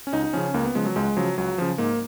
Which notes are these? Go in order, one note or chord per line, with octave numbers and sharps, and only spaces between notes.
C#4
C#2 D#4
D#4
C#3 F3 C#4
C#2 A#3
B3
C#3 F3 G#3
F#3
C#2 G#3
C#3 F3 F#3
C#2 F#3
C#3 F3
G#2 A#3